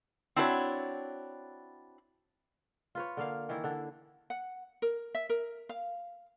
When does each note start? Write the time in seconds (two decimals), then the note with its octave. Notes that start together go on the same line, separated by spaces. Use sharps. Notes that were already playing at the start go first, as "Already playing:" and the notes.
0.36 C4 D4 E4 F#4 B4 C#5
2.95 F4 B4 C#5
3.17 D3 A#3 F5
3.49 D#3 E3 E4
3.64 D3 D4
4.30 F#5
4.82 A#4
5.15 E5
5.30 A#4
5.69 F5